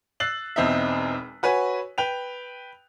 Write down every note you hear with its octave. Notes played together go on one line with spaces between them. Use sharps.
E6 F#6 A6 C7 F#7
E1 E2 C4 D#4 E5
F#4 B4 C#5 G#5
B4 G5 F7